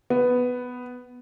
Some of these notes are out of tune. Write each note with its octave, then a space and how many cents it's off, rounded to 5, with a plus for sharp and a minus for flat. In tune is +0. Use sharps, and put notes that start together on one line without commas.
B3 +5